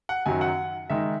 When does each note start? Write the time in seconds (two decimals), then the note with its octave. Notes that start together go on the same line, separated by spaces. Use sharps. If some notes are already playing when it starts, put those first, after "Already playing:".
0.09 F#5
0.26 F#2 D#3 F#3 G#5
0.41 F#5
0.90 D#3 G#3 D#4 E5